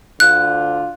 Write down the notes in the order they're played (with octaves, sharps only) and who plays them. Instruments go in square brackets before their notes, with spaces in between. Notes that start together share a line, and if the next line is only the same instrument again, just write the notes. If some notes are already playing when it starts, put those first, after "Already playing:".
[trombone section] D2 D3 F4 [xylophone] F#6